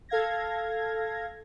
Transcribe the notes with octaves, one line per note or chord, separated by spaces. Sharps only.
A4 F5 G#6 A#6